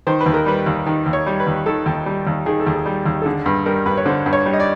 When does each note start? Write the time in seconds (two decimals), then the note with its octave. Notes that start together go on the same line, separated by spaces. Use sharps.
0.07 D#3 C5
0.21 B4
0.26 D#2
0.34 A#4
0.46 G3 B4
0.66 D#2
0.86 D#3
1.06 D#2
1.13 C#5
1.27 G3
1.40 B4
1.47 D#2
1.66 D#3 A4
1.86 D#2
2.06 G3
2.27 D#2
2.46 D#3 G#4
2.60 A4
2.67 D#2
2.74 G#4
2.86 G3
3.06 D#2
3.22 A4
3.26 D3 G#4
3.46 G2
3.66 G3 A#4
3.86 G2 B4
3.97 C#5
4.06 D3 C5
4.26 G2
4.33 C#5
4.46 G3
4.53 D#5
4.60 D5